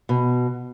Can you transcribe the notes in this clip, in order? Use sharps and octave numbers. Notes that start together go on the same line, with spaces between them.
B2